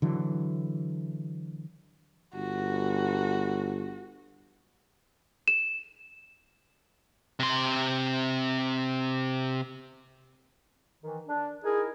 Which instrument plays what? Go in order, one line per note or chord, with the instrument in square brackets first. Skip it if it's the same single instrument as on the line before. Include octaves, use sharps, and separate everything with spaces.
[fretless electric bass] D3 E3 F#3
[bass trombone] G1 [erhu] F#4
[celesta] E7
[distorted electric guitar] C3 C6
[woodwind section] D#3 E3
D4
[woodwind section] D#4 E4 A#4 [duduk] G#4